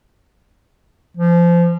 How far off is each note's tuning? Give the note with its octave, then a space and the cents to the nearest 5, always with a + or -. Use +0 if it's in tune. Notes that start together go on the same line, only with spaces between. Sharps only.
F3 -25